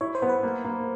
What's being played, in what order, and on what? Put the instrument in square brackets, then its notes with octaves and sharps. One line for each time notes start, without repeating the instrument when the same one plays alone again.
[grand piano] E4 [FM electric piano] C#5
[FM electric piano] C5
[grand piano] B3
[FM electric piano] B4
[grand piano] A#3
A#3